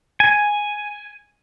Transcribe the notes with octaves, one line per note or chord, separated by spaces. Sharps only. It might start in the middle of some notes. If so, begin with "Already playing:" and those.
G#5